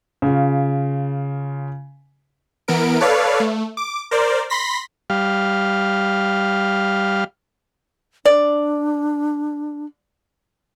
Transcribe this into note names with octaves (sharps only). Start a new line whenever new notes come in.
C#3 F4
E3 B3 A#4 D7
A4 B4 C#5 D5 F5
A3
D6
A#4 C5 D5
B5 C6 A#6 B6
G3 F5
D4 D5